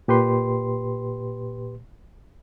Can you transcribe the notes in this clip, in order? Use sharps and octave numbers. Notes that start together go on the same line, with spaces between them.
A#2 G4 B4 C6